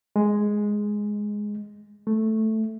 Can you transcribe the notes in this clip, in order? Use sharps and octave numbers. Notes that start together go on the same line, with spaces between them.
G#3
A3